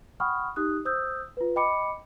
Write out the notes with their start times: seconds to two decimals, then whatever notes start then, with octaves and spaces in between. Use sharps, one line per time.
0.20 F#5 G5 B5 C#6 D#6 F6
0.56 D#4 G4 D#6 F#6
0.85 C5 D#6 E6 G6
1.37 F4 B4
1.56 D#5 G5 B5 D6 C#7